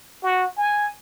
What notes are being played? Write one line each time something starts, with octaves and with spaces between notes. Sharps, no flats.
F#4
G#5